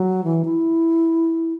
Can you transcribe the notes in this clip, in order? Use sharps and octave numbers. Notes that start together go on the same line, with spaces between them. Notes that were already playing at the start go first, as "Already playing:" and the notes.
Already playing: F#3
E3
E4